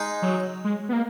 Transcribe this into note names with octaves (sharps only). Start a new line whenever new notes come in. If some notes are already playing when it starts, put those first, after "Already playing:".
Already playing: G#3 D#4 G#4
F#3
G#3
B3
A#3